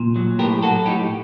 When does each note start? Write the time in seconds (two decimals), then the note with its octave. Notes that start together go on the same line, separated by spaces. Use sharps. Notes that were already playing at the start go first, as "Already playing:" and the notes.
Already playing: A#2
0.16 F#3
0.39 A2 G4 A#4
0.63 F#3 F#4 A4
0.86 A2 D#4 G4